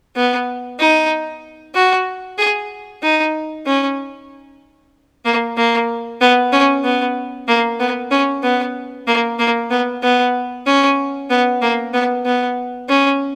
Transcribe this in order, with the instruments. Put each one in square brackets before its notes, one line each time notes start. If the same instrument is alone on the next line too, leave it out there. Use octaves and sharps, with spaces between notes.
[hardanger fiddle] B3
D#4
F#4
G#4
D#4
C#4
A#3
A#3
B3
C#4
B3
A#3
B3
C#4
B3
A#3
A#3
B3
B3
C#4
B3
A#3
B3
B3
C#4